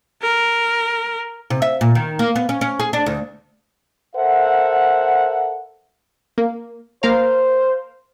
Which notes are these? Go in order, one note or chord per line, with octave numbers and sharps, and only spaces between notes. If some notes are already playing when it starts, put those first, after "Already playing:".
A#4
C3
E5
A#2
D#3
A#3
B3
C#4
C#4
G#4
D4
D2
A4 A#4 C5 E5 F#5
A#3
A#3 A#4 C5 F5